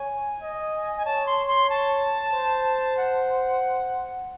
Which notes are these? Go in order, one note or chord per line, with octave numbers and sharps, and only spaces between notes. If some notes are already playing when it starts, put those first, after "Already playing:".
Already playing: C#5 G#5
D#5
G#5
C#5 A5
C6
C6
A5
C5
F#5